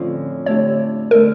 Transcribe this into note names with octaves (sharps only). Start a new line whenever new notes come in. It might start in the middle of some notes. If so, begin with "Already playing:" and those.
Already playing: F2 A2 D3 F3 C#4 F4
D3 A3 D4 G4 C#5
D3 A3 A#4